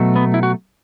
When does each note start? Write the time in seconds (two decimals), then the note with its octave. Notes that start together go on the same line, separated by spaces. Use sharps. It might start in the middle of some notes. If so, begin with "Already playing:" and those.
Already playing: B2 F#3 A3
0.16 B3
0.34 E4
0.43 F#4